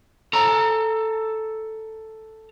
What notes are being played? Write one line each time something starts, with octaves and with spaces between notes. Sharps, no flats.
A4 A#5